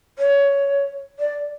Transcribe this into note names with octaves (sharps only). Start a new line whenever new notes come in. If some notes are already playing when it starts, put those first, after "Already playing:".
C#5
D5